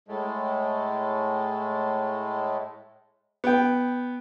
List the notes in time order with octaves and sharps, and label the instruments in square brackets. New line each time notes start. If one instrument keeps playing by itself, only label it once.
[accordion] A2 G#3 A3
[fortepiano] B3 G5